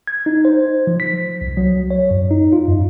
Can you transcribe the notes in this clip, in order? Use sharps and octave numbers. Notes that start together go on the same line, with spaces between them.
G#6
D#4
C5
F3
B6
C2
F#3
C#5
F#2
D#4
F4
F#2